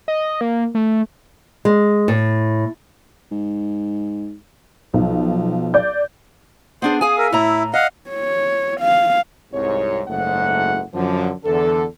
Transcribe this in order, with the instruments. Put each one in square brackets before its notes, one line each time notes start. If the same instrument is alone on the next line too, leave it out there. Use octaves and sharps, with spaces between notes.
[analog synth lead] D#5
A#3
A3
[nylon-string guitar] G#3
A2
[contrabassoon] G#2
[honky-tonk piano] B1 [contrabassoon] F3
[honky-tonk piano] D5 G6
[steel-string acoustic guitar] B3 D4 G#4 [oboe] C5
[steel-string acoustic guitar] G#4 F5 G#5 [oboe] D#6
[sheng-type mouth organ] A#4 [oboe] E5
[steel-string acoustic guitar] A2 A#5 [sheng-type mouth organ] E4
[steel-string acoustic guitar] D#5 [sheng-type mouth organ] F5 F#5
[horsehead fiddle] C#5
F5
[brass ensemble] C2 G#2 C3 C#5
F#1 G#2 A3 F#5
F#2 D3 F3
E2 D3 A4